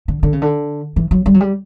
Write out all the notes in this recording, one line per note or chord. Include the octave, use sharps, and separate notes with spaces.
D3
D3
C#3
D3
E3
F#3
G3
F#3
G3